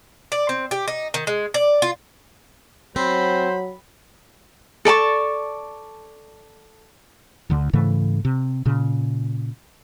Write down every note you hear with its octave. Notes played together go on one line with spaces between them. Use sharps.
D5
C4
G4
D#4
D#3
G#3
D5
F4
F#3 C4 C5 B5
A4 D5 A5 C#6
D2 D3
G#2 C#3 E3 A3
C3
A#2 C#3